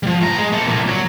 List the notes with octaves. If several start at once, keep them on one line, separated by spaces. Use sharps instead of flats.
F3 G3
A2 A#5
G#3
A#3 A4
C2 A#2
F#3